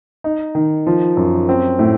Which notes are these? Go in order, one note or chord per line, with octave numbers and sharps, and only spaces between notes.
D#4
D#3
F3
F#2
C4
A2